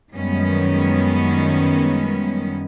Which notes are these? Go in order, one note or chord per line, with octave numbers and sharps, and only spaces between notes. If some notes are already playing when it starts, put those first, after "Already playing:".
F#2 D#3 G3 G#3 B3 C#4